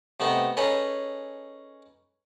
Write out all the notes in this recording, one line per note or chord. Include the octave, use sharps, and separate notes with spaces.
C3 A3 B3 D#4
C#4 D#4 G#4 A4 B4 C#5